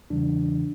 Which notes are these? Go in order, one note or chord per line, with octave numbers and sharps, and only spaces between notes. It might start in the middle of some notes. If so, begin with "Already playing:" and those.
E2 C#3 E3 G3 D4